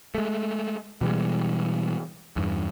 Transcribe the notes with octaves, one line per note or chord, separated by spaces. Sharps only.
G#3 A3
B2 E3 G3 G#3
E2 G2